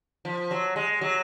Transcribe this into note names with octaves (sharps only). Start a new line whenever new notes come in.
F3
F#3
G#3
F#3